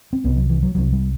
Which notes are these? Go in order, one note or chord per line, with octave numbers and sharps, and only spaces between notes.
C4
C2 C3 B3
F#3
E3
F#3
C2 C3 F#3
G3